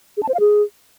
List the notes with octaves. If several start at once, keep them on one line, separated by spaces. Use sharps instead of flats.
G#4
A5
C5
F5
G#4